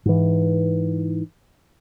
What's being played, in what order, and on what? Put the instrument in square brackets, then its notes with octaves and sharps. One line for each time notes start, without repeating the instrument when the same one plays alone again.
[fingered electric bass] G#2 E3